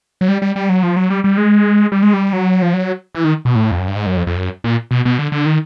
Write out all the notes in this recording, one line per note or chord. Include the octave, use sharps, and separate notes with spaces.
F#3
G3
G3
G3
F#3
F3
F#3
G3
G3
G#3
G3
G#3
G3
F#3
F3
F#3
E3
D#3
B2
A2
F2
F#2
G2
G#2
F#2
F2
F2
F#2
A#2
B2
B2
D3
D3
D#3